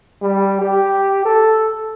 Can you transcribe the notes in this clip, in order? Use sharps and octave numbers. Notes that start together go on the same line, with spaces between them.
G3
G4
A4